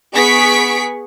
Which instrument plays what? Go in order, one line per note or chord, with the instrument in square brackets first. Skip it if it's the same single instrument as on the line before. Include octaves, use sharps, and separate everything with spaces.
[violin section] B3 G#4 C#6 B6 D7